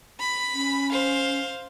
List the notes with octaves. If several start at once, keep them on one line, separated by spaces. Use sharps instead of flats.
B5
C#4
C5 F5